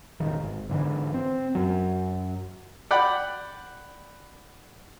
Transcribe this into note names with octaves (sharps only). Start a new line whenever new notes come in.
E1 A1 D#3
G#1
G#2 D3 E3
C4
F#2 F#3
D5 F#5 G5 B5